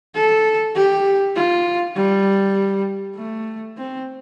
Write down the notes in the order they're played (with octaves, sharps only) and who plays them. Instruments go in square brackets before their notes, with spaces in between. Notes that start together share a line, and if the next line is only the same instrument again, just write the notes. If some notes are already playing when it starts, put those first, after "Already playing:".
[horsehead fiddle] A4
G4
F4
G3
A3
C4